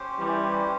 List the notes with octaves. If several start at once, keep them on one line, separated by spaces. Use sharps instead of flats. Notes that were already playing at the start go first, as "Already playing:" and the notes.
Already playing: C#4 G4 C5
E3 G3